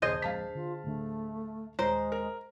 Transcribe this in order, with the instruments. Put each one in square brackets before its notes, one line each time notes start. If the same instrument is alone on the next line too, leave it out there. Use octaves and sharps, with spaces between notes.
[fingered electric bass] F#1 D#2 A#2 [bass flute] D4 [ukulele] G#4 C5 D#5
[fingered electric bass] D1 F2 G#3 [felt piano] F5 A5 B6
[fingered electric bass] D3 [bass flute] F4
[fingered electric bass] D1 D3 D4 [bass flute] A3
[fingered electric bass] D#1 [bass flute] G#3 [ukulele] C5 [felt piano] A#5
[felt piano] A#4